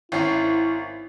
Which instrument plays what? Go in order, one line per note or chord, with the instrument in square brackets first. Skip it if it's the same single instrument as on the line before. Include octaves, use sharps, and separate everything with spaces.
[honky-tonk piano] G#1 C#4 C7 [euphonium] E4